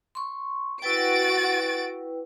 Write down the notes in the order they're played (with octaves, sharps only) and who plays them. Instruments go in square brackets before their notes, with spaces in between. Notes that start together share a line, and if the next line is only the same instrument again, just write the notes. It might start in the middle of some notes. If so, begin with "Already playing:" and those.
[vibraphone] C6 C#6
[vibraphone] E4 B4 G5 [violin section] F#4 A6 D7